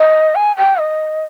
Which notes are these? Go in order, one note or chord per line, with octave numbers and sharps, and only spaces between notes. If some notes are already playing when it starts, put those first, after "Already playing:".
Already playing: D#5
G#5
G5
D#5